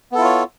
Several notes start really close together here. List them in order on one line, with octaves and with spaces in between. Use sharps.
B3 A4 E4 F4 C#5